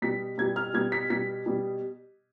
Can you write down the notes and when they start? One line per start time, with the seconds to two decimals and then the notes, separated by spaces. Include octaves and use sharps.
0.02 B2 G3 B6
0.38 B2 G3 G#6
0.56 F6
0.74 B2 G3 G#6
0.92 B6
1.10 B2 G3 B6
1.46 B2 G3